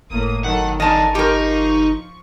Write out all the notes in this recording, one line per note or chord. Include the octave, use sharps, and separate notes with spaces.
G1 A2 A#3 D#6
D#3 F#3 A4 F#5
D#3 D4 A#4 D#5 G#5 A5
F3 D#4 G4 A#4 C#6